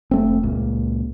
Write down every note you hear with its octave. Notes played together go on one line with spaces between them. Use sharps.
F1 A3 C4
C#2 A#2